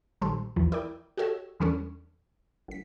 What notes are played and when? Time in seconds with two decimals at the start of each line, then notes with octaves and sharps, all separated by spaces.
0.21 A#1 D#3 G3 A4 C5
0.56 A#1 E2 E3 F3
0.72 E4 A#4 D5 G5
1.17 F#4 G4 A4 C#5 D#5 E6
1.60 E2 E3 G3 C#4 D4 A4
2.68 G1 B6